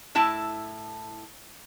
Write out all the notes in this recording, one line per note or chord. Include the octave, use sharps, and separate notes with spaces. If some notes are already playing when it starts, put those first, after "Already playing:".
A2 E4 A5